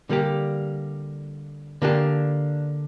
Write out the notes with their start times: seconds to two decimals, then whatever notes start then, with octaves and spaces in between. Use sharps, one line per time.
0.09 D3 G3 A#3 G4
1.82 D3 A#3 D4 G4